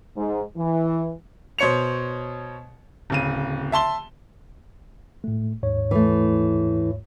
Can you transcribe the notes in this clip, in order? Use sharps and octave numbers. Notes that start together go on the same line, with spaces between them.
G#2
E3
B2 C5 C#5 C#7 F7
D1 C#3 D#7
E5 A5 C6 G7
A2 A3
D#2 G#2 C#5
E3 A3